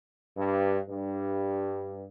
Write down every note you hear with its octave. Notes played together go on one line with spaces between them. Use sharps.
G2
G2